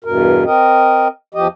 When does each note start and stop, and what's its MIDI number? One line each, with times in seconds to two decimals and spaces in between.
0.04 0.45 40
0.04 0.45 43
0.04 0.45 47
0.04 0.45 70
0.45 1.08 60
0.45 1.08 70
0.45 1.08 75
1.34 1.47 40
1.34 1.47 53
1.34 1.47 67
1.34 1.47 75